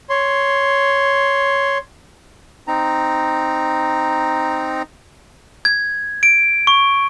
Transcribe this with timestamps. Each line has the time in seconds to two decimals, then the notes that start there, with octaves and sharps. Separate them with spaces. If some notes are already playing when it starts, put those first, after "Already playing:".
0.10 C#5 C6
2.68 C4 D#4 A#5
5.65 G#6
6.23 D7
6.67 C#6